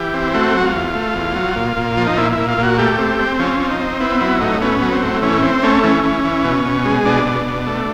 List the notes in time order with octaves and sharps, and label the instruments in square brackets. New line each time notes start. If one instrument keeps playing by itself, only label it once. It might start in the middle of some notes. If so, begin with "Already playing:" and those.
Already playing: [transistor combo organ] E3 G4
C4
A3 F#4
F#3 F#4
F4
E2
A3
E2
F#3
A#2
A#2
F3
D#4
A#2 E4
E4
A#2
F4
A#2
F#4
A3 G4
C4
C4
F3 C#4
C4
D#4
C4
B3 E4
F#3 E4
A2 D#4
B3 C#4
F#3
C4
A2
E3 C#4
C4
A3 C#4
E3 C#4
E3
E3
B2
B2
G#3
B2 D4
B2
B2
A3